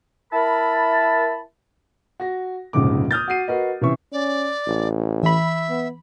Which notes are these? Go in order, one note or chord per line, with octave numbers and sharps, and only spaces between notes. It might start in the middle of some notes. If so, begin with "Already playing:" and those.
E4 A#4 A5 B5
F#4 A#6
F1 A#1 G#2 C#3 G#3 D6
D#6 F6 G6 A6
F#4 F#5 C7 D#7
F#4 A#4 B4 D#5
C3 E3 C#4 E5 C#6
C#4 D5
A1
E3 E5 B5
B3